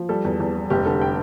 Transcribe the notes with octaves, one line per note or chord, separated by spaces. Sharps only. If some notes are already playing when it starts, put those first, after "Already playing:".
Already playing: F3
G3 A4
E2
E2
G3
F1 G4
D3 A4
G5